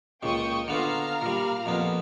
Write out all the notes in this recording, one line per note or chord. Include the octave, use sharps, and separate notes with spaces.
C#2 A#2 G5 C#6 D#6
D3 B3 F4 F5 A#5 F6
A#2 G3
F2 A#2 B3